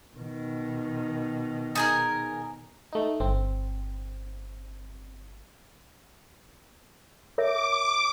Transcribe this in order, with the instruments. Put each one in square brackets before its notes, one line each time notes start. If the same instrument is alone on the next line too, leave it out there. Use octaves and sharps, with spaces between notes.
[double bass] B2 D#3
[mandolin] D#4 G#4 A#4
[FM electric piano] A3 D#4
[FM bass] G1 [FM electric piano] C4
[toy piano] A#4 C#5 E5 [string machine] D6